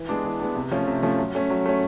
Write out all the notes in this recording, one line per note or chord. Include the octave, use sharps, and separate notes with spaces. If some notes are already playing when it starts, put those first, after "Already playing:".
Already playing: E3
G#3 B3 D4
E3
G#3 B3 D4
C3
F3 A3 C#4
C3
F3 A3 C#4
F#3
A3 C#4
F#3
A3 C#4